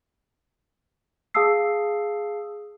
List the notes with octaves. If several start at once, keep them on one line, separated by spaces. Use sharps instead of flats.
G#4 F5 A5 D#6 E6 C7